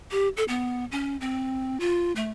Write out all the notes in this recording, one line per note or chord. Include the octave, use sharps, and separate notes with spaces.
G4
A4
B3
C#4
C4
F4
A3